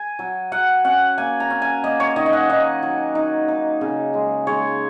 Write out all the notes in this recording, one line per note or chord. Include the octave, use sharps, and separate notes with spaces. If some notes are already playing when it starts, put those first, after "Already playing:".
Already playing: G#5
F#3
F#3 F#5
C#4 F#5
A#3 G#5
A#5
C#4
G#5
A#3 D#5
C#5
D#3 D#5
D#5
F#5
D#4 D#5
F#3
D#4
D#4
C#3
G#3
G#3 C#5